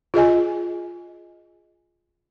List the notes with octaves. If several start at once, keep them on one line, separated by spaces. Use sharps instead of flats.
F4 G#4 D#5 G#5